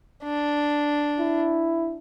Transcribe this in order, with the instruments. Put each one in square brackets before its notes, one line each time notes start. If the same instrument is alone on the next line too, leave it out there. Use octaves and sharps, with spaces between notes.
[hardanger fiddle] D4
[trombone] E4